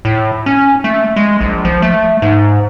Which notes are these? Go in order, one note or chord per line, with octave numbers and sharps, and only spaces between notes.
A2
C#4
A3
G#3
A#1
F3
A3
G#2